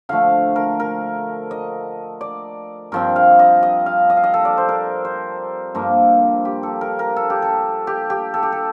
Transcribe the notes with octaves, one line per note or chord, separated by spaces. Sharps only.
D3 F3 A3 F5
A#4
A#4
D#5
D5
G2 F3 C4 A#4
F5
D#5
D#5
F5
D#5
F5
D#5
A4
D5
C5
A#4
C5
G2 F3 A#3 A#4
G4
A4
A#4
A#4
A4
G4
A4
G4
G4
A4
G4
A4